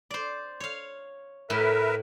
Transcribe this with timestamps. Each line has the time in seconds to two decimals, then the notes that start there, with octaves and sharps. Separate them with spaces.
0.11 C5 D5
0.60 C#5 F5
1.50 A2 A#4 B4 E5